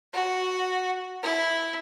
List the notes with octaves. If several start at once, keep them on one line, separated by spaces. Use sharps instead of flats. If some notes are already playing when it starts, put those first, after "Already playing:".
F#4
E4